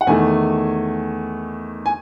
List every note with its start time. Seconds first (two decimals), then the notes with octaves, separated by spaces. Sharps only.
0.01 F#5
0.07 E2 D#3 A3 G#5
1.86 G#5